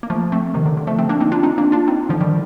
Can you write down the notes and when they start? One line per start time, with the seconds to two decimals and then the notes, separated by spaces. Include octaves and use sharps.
0.03 A#3
0.10 F3 A3
0.32 A3 C4
0.54 C3 D#3
0.66 D3
0.77 D3
0.87 F3 A3
0.99 A3 C4
1.09 A#3 D4
1.20 C4 D#4
1.32 D4 F4
1.43 C4 D#4
1.58 A#3 D4
1.72 D4 F4
1.88 C4 D#4
2.09 D3 F3
2.21 D#3 G3